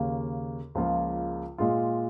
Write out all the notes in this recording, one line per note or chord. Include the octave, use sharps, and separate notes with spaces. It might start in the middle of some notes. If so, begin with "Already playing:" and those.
Already playing: D#2 C#3 A#3
C#2 C#3 F3 A#3 F4
A#2 G#3 F4